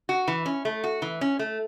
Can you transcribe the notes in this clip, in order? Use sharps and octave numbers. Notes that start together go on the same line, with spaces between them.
F#4
E3
C#4
A3
F#4
E3
C#4
A3